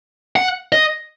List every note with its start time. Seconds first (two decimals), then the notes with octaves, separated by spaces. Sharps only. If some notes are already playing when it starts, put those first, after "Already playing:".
0.36 F#5
0.72 D#5